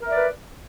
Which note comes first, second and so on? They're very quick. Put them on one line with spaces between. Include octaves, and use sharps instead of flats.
A#4 E5 D5 B4